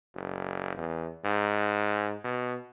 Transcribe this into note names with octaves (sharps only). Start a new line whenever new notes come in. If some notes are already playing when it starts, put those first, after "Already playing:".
F#1
E2
G#2
B2